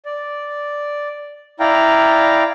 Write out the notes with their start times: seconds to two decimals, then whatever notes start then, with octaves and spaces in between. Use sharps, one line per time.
0.05 D5
1.60 E4 D5 F5 G5 A#5